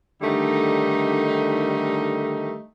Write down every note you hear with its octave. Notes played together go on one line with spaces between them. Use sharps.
D3 D#3 G3 A3 D#4